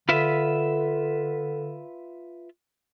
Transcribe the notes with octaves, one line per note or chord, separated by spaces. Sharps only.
D3 F4 B4 E5